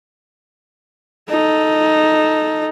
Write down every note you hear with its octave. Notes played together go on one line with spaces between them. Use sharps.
D#4 A4